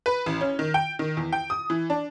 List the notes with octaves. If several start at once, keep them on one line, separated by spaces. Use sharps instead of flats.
B4
A1
C#4
D#3
G5
D#3
E2
G5
D#6
E3
D4